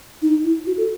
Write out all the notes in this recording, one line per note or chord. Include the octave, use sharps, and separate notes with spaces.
D#4
E4
F#4
A4